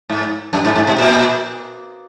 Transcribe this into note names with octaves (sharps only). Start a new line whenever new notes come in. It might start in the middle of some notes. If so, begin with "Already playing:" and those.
G#2
F#2
G#2
G#2
B2
A#2